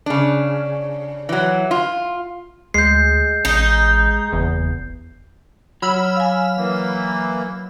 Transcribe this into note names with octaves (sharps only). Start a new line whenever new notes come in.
C#3 D4
E3 F#3
F4
D2 G#3 G6 C7
A1 D#4
F#1 E2
F#3 B5 E6 F6
F5 G#5
E3 A#3